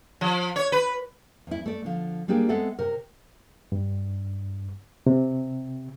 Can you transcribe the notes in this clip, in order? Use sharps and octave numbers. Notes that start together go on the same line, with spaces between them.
F3
C#5
B4
E2 E4
A3 D5
D3 F3
G3 A#3 D4 G4 G#4
G#3 B3 C4 A4 E5 F#5
C3 A#4
G2
C3